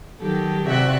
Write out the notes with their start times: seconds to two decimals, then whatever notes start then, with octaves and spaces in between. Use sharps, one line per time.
0.21 D#3 F#3 G4 A4
0.68 C3 F#4 D5 E5 F#6